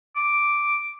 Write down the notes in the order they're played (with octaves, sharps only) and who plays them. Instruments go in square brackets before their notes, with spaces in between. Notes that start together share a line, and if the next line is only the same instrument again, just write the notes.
[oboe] D6